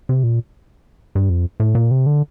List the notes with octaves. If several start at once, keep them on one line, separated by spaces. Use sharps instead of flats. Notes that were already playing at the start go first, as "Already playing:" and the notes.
C3
A#2
G2
F2
A2
A#2
C3
D3